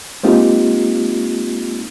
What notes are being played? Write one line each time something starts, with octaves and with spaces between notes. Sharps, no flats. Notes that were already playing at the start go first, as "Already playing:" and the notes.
G#3 A#3 C4 D#4 F4 G4